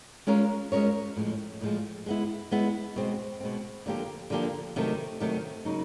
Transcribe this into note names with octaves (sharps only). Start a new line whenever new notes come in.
G#3 C#4 F4 A#4 C#5
G#3 C#4 F4 A#4 C#5
A2 F3 G#3
A2 F3 G#3
G#3 B3 E4
G#3 B3 E4
B2 G#3 C4
B2 G#3 C4
D3 F3 A#3 D4 G4
D3 F3 A#3 D4 G4
C3 D#3 F#3 A3
C3 D#3 F#3 A3
C#3 F#3 A#3 D#4